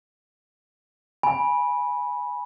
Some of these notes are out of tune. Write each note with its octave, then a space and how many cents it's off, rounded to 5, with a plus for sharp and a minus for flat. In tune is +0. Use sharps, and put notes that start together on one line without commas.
G#5 +0 B5 -15